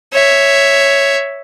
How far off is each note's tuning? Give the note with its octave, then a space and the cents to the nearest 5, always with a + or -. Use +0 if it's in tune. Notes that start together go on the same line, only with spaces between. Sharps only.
C#5 +0 E5 +0